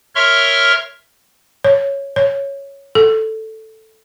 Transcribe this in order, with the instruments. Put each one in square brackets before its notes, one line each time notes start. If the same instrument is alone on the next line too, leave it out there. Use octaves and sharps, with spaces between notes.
[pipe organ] A#4 C#5 E5 C6 C#6 F6
[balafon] C#5
C#5
A4